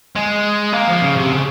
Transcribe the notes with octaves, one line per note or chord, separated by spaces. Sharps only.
G#3
A#3
F3
C#3
C3
C#3